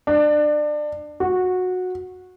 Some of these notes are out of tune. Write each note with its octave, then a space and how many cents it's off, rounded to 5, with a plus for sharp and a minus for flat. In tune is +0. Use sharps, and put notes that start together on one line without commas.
D4 +25
F#4 -15